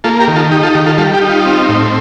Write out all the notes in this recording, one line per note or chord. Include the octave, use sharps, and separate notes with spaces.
A#3 F4 A4
G4 A#4
D#3
F4 A4
D#4 G4
F4 A4
D#3 G4
F4 A4
G3 F4 A4
G4
D#4
F4
C4
A2